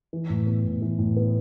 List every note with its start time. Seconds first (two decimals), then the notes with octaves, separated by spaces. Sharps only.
0.13 E3
0.29 A2
0.47 B3
0.64 A2
0.82 E3
0.99 A2
1.17 B3